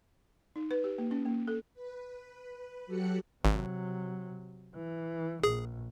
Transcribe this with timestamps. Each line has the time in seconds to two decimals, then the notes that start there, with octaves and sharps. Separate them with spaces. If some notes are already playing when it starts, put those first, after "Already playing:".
0.56 D#4
0.71 B4
0.84 G4
0.98 A#3
1.11 C#4
1.26 A#3
1.48 A4
1.74 B4
2.87 F#3 F#4 G4 A4 F#6 C#7
3.45 G#1 C3 F#3
4.75 E3
5.44 A#1 G#4